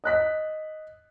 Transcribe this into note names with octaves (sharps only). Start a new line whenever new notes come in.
D#5 F#6 B6